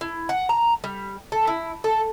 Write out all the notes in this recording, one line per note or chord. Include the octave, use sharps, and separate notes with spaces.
E4
F#5
A#5
G3
A4
E4
A4